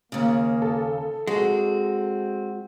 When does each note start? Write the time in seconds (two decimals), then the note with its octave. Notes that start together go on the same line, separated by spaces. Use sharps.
0.12 D#2 C#3 A#3
0.62 A4
1.27 G#3 C4 F#4